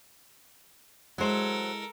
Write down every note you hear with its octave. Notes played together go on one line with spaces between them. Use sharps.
F#3 G#3 E4 A4 A#4 C5